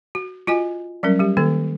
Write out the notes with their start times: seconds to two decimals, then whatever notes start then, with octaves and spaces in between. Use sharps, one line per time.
0.15 F#4
0.47 F4 F#4 D#5 G#5
1.03 F#3 G3 C#4 A#4
1.19 G3 G4
1.37 D#3 A#3 A4